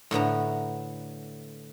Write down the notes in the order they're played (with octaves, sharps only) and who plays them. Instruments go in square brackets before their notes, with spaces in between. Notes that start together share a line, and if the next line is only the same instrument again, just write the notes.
[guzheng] A2 D3 B3 A#5